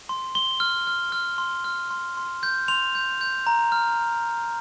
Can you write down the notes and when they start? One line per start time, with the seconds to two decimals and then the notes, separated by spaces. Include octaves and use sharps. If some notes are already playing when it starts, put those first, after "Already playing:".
0.09 C6
0.35 C6 G7
0.60 F6
0.87 F6
1.12 F6
1.38 C6
1.64 F6
1.91 C6
2.17 C6
2.43 G6
2.68 C6 F7
2.95 G6
3.21 G6
3.47 A#5
3.72 F6